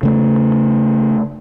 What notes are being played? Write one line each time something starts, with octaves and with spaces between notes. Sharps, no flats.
C#3 A3